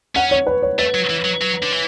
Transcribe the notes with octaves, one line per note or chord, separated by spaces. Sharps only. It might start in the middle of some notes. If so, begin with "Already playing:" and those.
C#4 F#5
C#5
B4
C#5
A3 B4
F#3
E3
F#3
F#3
D3
E3